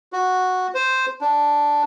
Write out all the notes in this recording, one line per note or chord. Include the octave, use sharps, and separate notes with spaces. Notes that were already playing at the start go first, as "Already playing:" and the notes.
F#4
C5
D4